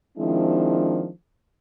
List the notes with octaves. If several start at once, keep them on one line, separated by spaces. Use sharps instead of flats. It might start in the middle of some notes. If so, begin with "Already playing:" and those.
D#3 F3 G#3 C4 D4 E4